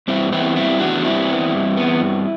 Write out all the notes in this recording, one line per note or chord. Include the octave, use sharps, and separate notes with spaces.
G2 C4 E4
E3 B3 C4 E4
G2 C4 E4
E3 B3 D4 F#4
G2 C4 E4
E3 B3
G2
E3 B3
G2